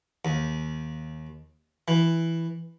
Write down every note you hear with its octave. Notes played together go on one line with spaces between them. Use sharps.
D#2
E3